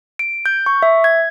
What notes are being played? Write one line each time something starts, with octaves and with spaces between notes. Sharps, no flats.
D7
G6
C#6
E5
G#6